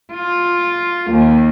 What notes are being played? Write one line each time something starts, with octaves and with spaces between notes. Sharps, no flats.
F4
D#2